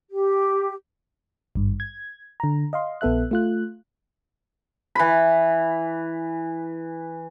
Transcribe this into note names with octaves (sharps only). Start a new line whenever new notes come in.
G4
G#1 G2
G#6
D3 A#5
D#5 F5 C6
A#1 B3 A4 E5 F#6
A3 F4 F#6
E3 B5